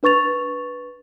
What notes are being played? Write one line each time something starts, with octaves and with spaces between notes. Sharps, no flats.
D4 B4 C#6 A6 F7